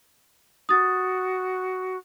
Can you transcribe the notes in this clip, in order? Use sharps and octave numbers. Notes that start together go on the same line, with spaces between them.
F#4 D#6 A6